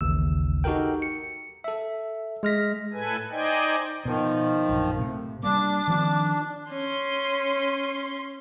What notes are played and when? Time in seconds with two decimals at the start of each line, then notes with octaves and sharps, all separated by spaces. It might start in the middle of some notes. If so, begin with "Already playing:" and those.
0.01 A1 D#2 C#3 E6
0.64 D#4 F#4 G4 A4 A#4 G5
1.02 C#7
1.64 A4 E5
2.43 G#3 F6 A#6 B6
2.93 A2 A4 B4 G#5
3.31 D#4 C5 D5 D#5 G5 G#5
4.05 B2 D#3 F3
4.69 A#1 F#2
4.97 A2 C3 A3
5.43 G3 A3 A#3 D4 D6
5.88 D#3 F3 C4
6.70 C#4 C6